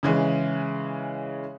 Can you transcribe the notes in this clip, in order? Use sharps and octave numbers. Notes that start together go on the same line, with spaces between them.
C#3 E3 G#3